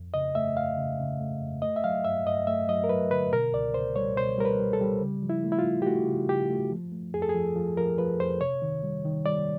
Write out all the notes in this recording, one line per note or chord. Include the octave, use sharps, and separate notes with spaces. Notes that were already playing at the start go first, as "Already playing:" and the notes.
Already playing: F2
C#3 D#5
A3 E5
F2 F5
C#3
C#3
A3
F2
A3 D#5
E5
F#3 F5
G2 E5
G2 D#5
A3 E5
F#3 D#5
A#4
F#3 B4
D3 B4
B2 A#4
C#2 D5
C#2 C5
G3 C#5
B2 C5
G3 A#4
B4
G3
A4
G3
C#3
F3
E4
A3
E4
F4
A3
G4
A3 F#4
C#3
C#3 G4
A3
F3
A3
F2 G#4
A4
G#4
F3
F3
F3 A#4
F3 B4
F2 C5
C3 C#5
D#3
G3
D#3
G3 D5